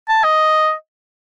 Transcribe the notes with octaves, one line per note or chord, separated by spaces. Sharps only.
A5
D#5